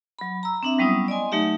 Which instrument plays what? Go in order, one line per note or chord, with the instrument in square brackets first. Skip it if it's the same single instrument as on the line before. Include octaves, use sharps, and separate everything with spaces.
[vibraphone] F#3 B5
A#5 E6
C4 D4 E5
F#3 G3 B3 C#4 E4 D#6
D5 D#5 G#5 C6
F#3 A3 D#4 G4 E5